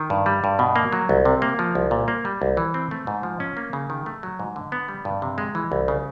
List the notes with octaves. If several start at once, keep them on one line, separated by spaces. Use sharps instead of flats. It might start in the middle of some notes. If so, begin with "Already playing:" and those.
Already playing: D#3
G2
G3
G2
B2
A#3
F#3
C2
C3
A#3
F3
C2
A#2
A#3
G3
C2
E3
C4
A3
G#2
F3
C#4
A#3
C#3
D#3
A3
F#3
G#2
D3
B3
G3
G2
C3
G#3
E3
C2
C#3